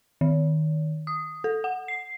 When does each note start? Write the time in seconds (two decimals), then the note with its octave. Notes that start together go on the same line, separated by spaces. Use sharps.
0.21 D#3
1.07 D#6
1.44 A4
1.64 F#5
1.88 C7